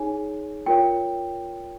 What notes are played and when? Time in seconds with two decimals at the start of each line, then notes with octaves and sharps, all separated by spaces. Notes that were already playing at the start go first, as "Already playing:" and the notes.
Already playing: D#4 G#4 C#5 G#5
0.66 F4 A#4 C#5 G5